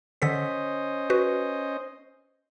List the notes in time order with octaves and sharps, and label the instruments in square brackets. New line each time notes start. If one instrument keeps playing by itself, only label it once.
[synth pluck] D3 A4 B6 [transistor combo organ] C#4 C5 D#5
[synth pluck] F#4 B4